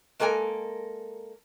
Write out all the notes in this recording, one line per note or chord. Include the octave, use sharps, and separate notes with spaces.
G#3 A#3 A4 A#4 G#5